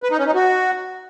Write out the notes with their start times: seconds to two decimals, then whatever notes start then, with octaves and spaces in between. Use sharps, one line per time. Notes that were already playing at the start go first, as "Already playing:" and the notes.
0.03 B4
0.11 D#4
0.19 C#4
0.26 D#4
0.34 F#4